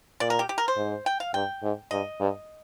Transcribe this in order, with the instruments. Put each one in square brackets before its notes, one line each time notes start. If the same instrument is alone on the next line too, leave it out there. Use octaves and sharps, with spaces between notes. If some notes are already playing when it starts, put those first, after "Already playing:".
[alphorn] A#2 [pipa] D5
[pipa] A#4
G4
G4
A#4
C5
[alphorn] G#2
[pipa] G5
F5
[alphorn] G2 [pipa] G5
[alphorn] G#2
[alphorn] G2 [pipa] D#5
[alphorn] G2